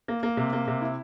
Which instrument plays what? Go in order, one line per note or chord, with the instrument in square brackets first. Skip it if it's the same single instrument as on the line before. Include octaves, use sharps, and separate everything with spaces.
[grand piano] A#3
A#3
C3
A#3
C3
E4